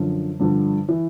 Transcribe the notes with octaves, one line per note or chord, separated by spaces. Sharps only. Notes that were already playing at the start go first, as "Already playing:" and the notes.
Already playing: F#2 D3 F3
G2 D3 F3
E3